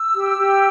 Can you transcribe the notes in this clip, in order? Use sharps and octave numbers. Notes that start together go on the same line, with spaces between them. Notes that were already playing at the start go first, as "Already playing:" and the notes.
Already playing: E6
G4
G4